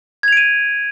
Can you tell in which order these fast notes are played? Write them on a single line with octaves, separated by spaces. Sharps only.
G#6 F7 D7 D#7